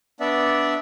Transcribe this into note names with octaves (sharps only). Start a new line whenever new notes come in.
B3 D4 D5 E5